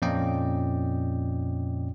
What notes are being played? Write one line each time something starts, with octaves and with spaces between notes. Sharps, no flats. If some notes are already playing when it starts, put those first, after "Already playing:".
F2 A#2 C#4 D5 D#5 G5